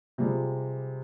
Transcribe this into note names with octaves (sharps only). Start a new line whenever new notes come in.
C3 F3 G3 G#3